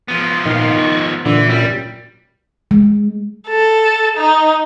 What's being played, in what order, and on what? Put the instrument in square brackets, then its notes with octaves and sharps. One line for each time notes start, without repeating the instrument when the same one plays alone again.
[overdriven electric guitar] F3 B3
[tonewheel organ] A#2 F5 [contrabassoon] D#3
[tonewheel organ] C#6
[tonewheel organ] A#2 [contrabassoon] D3 [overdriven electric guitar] E3
[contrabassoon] F#2 [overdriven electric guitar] G3
[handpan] G#3
[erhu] A4
D#4